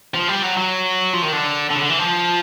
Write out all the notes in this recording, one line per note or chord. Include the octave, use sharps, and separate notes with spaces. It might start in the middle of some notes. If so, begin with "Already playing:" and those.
F3
G3
F#3
F#3
F3
D#3
D3
D3
C#3
D3
E3
F3